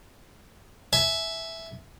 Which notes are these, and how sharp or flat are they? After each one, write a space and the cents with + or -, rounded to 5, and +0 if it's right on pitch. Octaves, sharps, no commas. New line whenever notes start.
E5 +0 G#5 +35